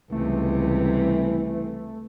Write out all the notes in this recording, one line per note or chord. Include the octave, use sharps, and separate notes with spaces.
C#2 C3 E3 G3 A3